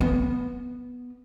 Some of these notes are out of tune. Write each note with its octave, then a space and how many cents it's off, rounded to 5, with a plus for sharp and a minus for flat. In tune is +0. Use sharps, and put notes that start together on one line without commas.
B3 -5